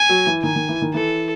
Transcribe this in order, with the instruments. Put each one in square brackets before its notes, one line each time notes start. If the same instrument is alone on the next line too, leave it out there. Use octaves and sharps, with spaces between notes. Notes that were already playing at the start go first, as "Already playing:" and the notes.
Already playing: [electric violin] G#5
[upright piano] F#3
E3
[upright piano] D#3 [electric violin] G#5
[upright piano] D#3
E3
D#3
[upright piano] E3 [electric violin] A4